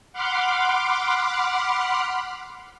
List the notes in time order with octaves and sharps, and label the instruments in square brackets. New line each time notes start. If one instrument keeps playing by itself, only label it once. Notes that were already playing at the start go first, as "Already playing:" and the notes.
[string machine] F#5 B5 C6 D6 F6